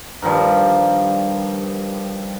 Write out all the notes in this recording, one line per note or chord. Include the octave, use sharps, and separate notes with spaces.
G2 D#3 F3 G3